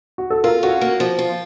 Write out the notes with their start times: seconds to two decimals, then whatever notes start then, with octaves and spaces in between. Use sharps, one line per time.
0.18 F#4
0.30 A4
0.44 F4 A#4
0.63 C#4 F#4
0.81 A#3
1.00 F3
1.19 F4